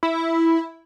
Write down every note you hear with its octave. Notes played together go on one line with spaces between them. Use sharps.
E4